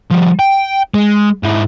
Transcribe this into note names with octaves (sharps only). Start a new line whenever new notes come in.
F3 G3
G5
G#3
G#2 E4